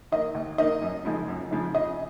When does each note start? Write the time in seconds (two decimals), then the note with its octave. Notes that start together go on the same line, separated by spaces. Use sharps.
0.12 D#3 A#3 D#4 D#5
0.35 D#2
0.58 D#3 A#3 D#4 D#5
0.82 F#2
1.05 C#3 F3 G#3 D#4
1.28 F#2
1.51 C#3 F3 G#3 D#4
1.74 C#3 D#5